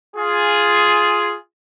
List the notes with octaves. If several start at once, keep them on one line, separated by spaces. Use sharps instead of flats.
F4 G#4